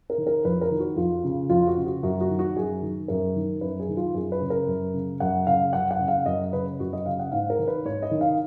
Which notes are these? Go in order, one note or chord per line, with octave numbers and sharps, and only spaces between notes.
A#4
D#3
A#4
F2 B4
A#4
D#3
F#4
F2 F4
C#3
F2 F4
F#4
C#3
F#4
F#2 F#4
F#4
D#3
F#4
F#2 G#4
D#3
F#2 A#4
D#3
F#2 B4
G#4
D#3
F4
F#2 G#4
B4
C#3
A#4
F#2
C#3
F#2 F#5
C#3 F5
F#2 F#5
F#5
C#3
F5
F#2 D#5
C#3 B4
F#2 F#4
D#5
C#3 F5
F#5
G#2 F5
A#4
D#3
B4
G#2 C#5
D#5
D#3
F5